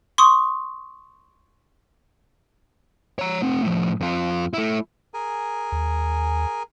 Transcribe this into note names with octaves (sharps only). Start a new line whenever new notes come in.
C6 C#6 D#6
C#5 A#5
A3 C4
A2 F3
F2 F4
A3 E4
G#4 A#4 G#5
D#2